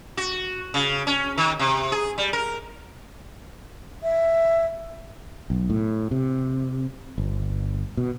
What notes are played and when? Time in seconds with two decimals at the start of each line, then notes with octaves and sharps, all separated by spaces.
0.17 F#4
0.74 C#3
1.07 C#4
1.38 D#3
1.59 C3
1.92 G#4
2.18 G3
2.33 A#4
4.03 E5
5.50 B1
5.70 A2
6.11 C3
7.18 G1
7.97 B2